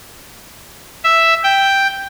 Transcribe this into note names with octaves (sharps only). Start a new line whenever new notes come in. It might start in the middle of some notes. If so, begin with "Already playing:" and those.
E5
G5